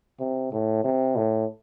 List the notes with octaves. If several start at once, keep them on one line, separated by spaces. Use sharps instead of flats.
C3
A2
C3
A2